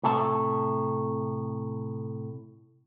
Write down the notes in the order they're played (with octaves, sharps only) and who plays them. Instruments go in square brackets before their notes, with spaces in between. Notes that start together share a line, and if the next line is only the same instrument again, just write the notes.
[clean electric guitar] A2 C3 A4 E5 A5